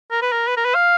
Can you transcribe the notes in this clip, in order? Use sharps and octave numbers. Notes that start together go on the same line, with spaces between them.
A#4
B4
A#4
B4
A#4
B4
F5